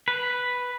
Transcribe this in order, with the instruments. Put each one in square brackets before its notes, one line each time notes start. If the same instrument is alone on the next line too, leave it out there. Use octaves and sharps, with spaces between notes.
[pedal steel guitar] B4